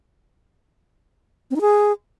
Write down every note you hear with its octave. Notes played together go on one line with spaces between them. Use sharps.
C4
D#4
G#4